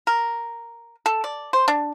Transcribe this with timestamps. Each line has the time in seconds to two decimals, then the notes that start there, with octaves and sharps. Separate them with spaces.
0.07 A#4
1.06 A4
1.24 D5
1.53 C5
1.68 D4